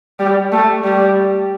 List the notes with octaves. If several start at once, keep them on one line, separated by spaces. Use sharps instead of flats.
G3
A3
G3